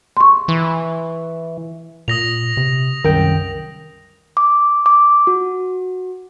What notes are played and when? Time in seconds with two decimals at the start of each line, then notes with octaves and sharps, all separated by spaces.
0.17 C6 C#6
0.48 E3
2.08 A#2 D#6 A#6 F7
2.57 C3
3.04 C2 F#2 D#3 A#4 G5
4.37 D6
4.86 D6
5.27 F#4